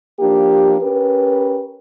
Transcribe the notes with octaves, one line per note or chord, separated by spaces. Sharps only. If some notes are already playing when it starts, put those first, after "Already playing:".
F3 A#3 D4 G4
C#4 G4 A#4 B4